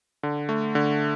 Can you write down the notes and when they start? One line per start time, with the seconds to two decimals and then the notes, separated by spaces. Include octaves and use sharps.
0.23 D3
0.49 A3
0.75 D3